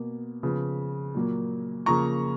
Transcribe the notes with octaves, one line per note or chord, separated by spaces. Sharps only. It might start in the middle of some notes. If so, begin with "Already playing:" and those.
Already playing: B2 A#3
C#3 F3 B3
A#2 F#3 A#3
C#3 F3 A#3 A#5 C#6